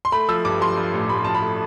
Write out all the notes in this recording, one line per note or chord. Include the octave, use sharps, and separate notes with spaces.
C6
A3 B5
F3 E6
G2 D6
F3 C6
F3
A1
A1 B5
F3 A5
B5
A3